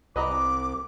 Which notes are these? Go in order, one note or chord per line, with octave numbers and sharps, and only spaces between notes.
C2 B4 D#5 A#5 D6